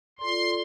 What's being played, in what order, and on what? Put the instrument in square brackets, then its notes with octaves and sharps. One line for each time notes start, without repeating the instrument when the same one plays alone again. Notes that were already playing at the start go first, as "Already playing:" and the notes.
[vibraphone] F4 A4 D5 [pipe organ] C6